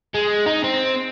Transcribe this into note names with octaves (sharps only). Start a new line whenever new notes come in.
G#3
D#4
C4